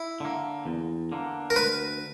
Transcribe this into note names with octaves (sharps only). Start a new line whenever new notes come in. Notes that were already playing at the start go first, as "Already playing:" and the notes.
Already playing: E4
D3 A#3
E2
D3 A#3
A#4
D2 B4